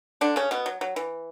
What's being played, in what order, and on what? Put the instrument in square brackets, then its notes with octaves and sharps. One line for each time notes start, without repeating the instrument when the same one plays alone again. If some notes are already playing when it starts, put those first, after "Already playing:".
[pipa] D3 D4
C#3 C#4
B2 B3
F#3
F#3
E3